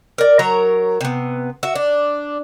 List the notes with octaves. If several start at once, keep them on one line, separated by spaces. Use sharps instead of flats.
A#4 D5
F#3 A#4 C#5 A#5
C3 B3
F#4 E5
D4